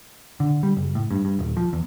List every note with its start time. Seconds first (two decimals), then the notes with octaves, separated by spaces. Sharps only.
0.40 D3
0.63 G3
0.77 F#1
0.95 A2
1.11 G2
1.25 G2
1.39 D#1
1.57 F3
1.73 E2